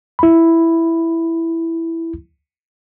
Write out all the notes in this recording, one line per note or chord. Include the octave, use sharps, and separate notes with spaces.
E4 B5